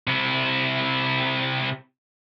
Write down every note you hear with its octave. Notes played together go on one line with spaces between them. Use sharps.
C3 E4